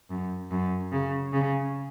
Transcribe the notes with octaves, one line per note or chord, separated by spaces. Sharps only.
F#2
F#2
C#3
C#3